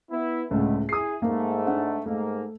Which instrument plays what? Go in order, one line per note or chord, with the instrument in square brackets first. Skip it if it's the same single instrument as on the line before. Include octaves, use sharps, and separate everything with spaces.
[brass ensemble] B3 E4
[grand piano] C#2 A2 [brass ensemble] D3 G#3 A3
[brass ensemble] E4 G#4 [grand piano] D#6 C7
[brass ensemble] G#2 A3 [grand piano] A#3
[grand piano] D4 F#5
[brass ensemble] G#2 A#3 [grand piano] A3